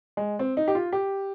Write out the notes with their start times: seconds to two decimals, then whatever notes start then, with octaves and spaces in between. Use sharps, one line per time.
0.17 G#3
0.39 C4
0.57 D#4
0.68 G4
0.75 F4
0.92 G4